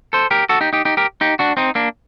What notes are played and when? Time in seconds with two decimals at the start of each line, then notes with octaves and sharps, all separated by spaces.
0.13 A4 C5
0.31 G4 A#4
0.49 F#4 A4
0.61 D#4 G4
0.73 D#4 G4
0.85 D#4 G4
0.97 G4 A#4
1.21 D#4 G4
1.39 D4 F#4
1.57 C4 D#4
1.75 A#3 D4